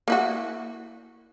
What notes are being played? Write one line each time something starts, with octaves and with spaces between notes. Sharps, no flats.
A#3 E4 F#4